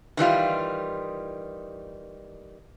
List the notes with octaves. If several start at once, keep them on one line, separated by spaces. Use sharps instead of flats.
D#3 E3 G3 F4